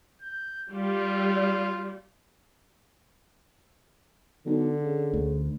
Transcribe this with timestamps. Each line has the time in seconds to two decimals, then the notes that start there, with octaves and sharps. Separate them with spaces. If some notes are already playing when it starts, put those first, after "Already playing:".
0.22 G6
0.72 G3 F4
4.46 B1 D3
4.83 C#3
5.13 D2